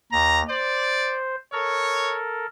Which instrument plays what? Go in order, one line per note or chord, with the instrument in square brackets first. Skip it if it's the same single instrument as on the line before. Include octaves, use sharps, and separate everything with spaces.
[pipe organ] D#2 A#6 [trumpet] A#5
[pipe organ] C5 [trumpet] D5
[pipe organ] A4 A#4 [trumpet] C#5